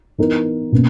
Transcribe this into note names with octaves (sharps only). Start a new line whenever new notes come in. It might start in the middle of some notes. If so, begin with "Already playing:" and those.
E3 B3 D#4 A#4
B2 A#3 C#4